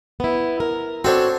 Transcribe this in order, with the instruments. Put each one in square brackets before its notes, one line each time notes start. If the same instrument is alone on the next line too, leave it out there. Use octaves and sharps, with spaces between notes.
[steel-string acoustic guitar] B3 E4
A#4
[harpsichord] C4 D4 [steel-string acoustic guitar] F#4 A4 C#5